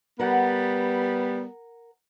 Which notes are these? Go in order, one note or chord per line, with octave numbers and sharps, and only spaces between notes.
G3 B3 A#4 F#5